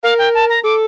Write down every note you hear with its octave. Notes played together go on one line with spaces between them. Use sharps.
A#4 F5
G5
A5
A#5
A4 D6